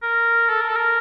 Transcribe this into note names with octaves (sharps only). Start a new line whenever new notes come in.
A#4
A4
A#4
A4
A#4